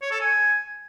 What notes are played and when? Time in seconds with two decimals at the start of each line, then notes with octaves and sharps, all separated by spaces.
0.02 C#5
0.11 A4
0.21 G#5